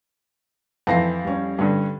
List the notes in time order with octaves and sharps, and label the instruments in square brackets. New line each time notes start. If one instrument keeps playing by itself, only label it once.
[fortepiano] F2 E3 C4 [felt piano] A5 A#6 C7
[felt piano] G3 C#4
[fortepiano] G2 D3